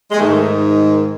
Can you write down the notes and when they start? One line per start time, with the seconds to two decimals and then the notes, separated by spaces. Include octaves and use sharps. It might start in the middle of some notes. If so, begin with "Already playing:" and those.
0.11 G#3
0.17 G#2 D#3 A3